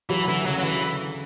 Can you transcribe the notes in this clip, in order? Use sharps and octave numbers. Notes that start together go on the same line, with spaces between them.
E3 F#3
D3 E3
C#3 F#3
F#3
E3